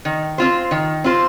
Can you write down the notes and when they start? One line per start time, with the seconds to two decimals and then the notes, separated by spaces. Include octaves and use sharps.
0.05 D#3
0.38 C4 F4 C5
0.71 D#3
1.04 C4 F4 C5